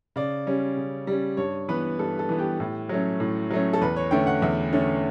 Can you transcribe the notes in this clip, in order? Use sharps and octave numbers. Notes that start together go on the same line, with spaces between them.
C#3 D5
G3 C#4
C#3
G3 C#4
G2 C#5
E3 B3 B4
G2 A4
A4
E3 B3
G4
A2
F#3 A3 C#4
A2
F#3 A3 C#4
A4
E2 B4
C#5
D3 A3 C#4 G5
F#5
E2 E5
D3 A3 C#4